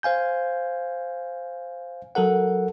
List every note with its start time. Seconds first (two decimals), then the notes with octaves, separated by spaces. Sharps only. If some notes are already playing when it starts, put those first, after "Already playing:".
0.03 C5 F5 G#5 G6
2.15 F#3 A4 A#4 F#5